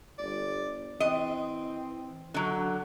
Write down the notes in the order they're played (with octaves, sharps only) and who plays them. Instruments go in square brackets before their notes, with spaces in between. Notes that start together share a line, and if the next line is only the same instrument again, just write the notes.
[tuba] G1 [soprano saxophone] D5
[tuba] E3 [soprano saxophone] C4 [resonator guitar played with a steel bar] D#5
[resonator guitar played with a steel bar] D3 F#3